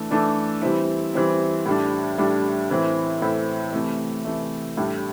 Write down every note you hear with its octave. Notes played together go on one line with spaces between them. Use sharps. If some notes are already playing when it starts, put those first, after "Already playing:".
Already playing: E3 A3 D4 A4
E3 A3 D4 A4
E3 G3 C4 E4
E3 G3 C4 E4
A2 G3 D4
A2 G3 D4
A2 E3 C4 E4
A2 E3 C4 E4
C3 E3 A3
C3 E3 A3
A2 G3 D4 A4